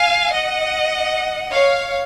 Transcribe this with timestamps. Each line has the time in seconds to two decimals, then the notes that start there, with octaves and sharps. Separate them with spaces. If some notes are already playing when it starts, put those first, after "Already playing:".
Already playing: F5 G#5
0.32 D#5 F#5
1.52 C#5 F5